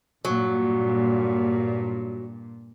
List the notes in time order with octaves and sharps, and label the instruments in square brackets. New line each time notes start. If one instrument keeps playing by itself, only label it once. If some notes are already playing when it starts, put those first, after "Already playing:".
[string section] G2 A#2 [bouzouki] F#3